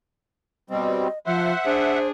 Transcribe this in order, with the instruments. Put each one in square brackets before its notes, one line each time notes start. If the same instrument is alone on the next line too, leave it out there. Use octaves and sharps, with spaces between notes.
[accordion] B2 G3 C4 [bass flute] D#5
[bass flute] F3 [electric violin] C5 [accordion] E5 F#5
[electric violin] D4 G#4 [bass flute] C5